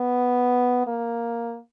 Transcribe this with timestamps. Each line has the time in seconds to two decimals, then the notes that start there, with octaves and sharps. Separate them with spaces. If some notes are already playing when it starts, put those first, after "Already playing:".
Already playing: B3
0.87 A#3